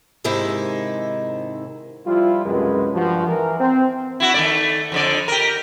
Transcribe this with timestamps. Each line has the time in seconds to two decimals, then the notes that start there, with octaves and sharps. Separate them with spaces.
0.24 G#2 C3 D#3 G#3 E4
2.07 F3 G3 E4 F4
2.46 C#2 F#2 C3 G#3 A3 B4
2.94 G2 F3 F#4
3.27 E3 A#4
3.60 C4
4.20 E4 F#4
4.34 D#3 A3 D5
4.92 F2 D3 D5
5.28 G4 A#4